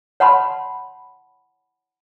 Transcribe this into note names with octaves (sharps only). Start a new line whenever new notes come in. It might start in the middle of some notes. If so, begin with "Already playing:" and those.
C#5 F#5 A5 B5 C6